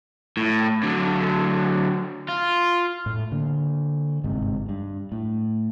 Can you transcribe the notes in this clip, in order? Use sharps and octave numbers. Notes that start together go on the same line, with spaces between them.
A2
D3 F#3
F4
A2 A3
D3 A#3
G1 G#2 C3
G2
A2